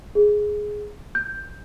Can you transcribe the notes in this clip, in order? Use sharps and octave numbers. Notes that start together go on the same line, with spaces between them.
G#4
G6